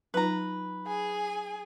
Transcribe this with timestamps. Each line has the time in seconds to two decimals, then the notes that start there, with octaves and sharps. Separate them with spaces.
0.14 F#3 D#4 F4 B4 A#5
0.87 G#4 G#5